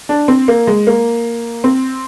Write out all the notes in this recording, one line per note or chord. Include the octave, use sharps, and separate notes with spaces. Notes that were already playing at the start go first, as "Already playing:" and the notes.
D4
C4
A#3
G#3
A#3
C4